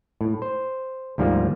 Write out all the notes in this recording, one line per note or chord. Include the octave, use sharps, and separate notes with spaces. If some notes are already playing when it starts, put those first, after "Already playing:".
A2
C5
D2 G#2 F3 G3 A#3